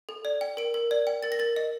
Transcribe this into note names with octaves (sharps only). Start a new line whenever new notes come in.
A4
D5
G5
A#4 D7
A#4
D5
G5
A#4 A6
A#6
A#4 A6
D#5